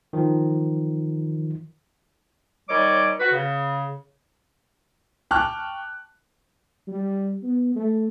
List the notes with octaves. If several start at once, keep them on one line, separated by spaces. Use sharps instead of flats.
D#3 F3
D#2 G3 C#5 D#5 D6
F#4 B4
C#3
G5 A5 C#6 D6 F6 F#6
G3
B3
A3